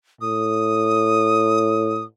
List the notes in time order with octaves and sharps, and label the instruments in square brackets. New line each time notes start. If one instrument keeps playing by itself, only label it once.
[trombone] A2 [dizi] D#6